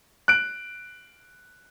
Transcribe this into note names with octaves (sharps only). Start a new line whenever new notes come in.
F#6 D7